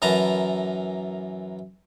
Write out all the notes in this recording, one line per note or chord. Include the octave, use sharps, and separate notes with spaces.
F#2 E3 A#4 B4 A5 A#5